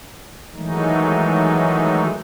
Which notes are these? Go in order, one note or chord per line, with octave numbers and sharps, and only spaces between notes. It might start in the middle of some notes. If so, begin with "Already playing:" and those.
D#3 E3 F#3 G#3 A3 D#4